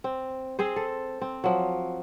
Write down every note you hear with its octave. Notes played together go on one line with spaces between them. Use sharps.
C4
C4 G#4 C5
A4
C4
F3 F#3